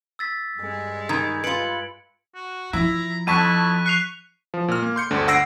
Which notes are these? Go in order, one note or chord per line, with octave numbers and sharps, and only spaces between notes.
E6 A6 B6
G2 G#3
D#3 B5 G#6
F4 B4 C#7 D7 F#7
F#4
F3 E4 A#5
F2 E4 A5 C#6 F#6 B6 D#7
C#6 F#6 C7 F7
F3
A#2 F6
A#3
C6 G6 C#7
G1 D2 D3
F#5 E6 A#6 C7 D7